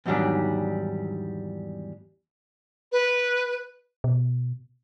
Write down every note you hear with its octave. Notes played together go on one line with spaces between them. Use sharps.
E2 G#2 D#3 F#3 G3 D4
B4
B2